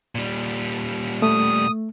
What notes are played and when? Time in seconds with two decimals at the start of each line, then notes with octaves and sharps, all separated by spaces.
0.15 A#2 G3
1.22 A3 D#6